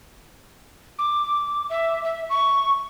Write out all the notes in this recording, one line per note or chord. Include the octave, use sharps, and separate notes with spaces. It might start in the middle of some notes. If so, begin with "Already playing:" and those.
D6
E5
E5
C#6